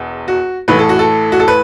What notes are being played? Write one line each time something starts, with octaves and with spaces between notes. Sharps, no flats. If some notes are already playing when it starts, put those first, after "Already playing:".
Already playing: E1 E2
F#4
A1 A2 E3 B4
A4
F#4
A4
F#4
A4
B4